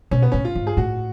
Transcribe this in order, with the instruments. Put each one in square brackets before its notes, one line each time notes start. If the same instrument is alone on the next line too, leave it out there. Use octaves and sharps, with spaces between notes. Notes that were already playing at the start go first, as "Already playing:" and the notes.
[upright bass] B2 [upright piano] C#4
[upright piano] B3
[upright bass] A2 [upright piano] C#4
[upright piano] F4
[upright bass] G#2
[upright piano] G#4
[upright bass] A2 [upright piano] F#4